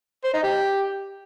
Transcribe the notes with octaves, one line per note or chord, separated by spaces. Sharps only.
C5
D#4
G4